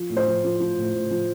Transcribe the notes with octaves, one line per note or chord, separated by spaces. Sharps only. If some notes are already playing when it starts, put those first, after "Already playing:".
Already playing: F3
A2
C5
F3
F3
F3
A2
A2
F3